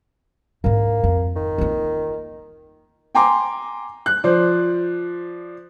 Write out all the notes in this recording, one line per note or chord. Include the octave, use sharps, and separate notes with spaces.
G#2 A#3 D4
F2
D#3
A#3 F4
G5 G#5 A#5 C6 D6
F#6
F3 C5 D5